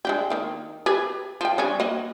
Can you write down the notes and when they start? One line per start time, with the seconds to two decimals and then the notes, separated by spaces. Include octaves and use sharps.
0.05 G#3 D4 G4
0.30 D#3 A#3
0.86 G4 G#4 B4
1.41 F3 G5
1.58 G3 C#4 D4
1.80 A#3 F#4 D#5